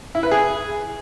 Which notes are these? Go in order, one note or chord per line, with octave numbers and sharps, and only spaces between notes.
E4
B4
G#4